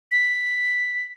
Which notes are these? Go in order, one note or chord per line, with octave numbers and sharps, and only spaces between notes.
B6